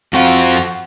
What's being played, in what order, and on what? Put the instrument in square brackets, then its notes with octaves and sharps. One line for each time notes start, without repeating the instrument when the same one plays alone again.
[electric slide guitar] F2 C4 F4 [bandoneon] F#4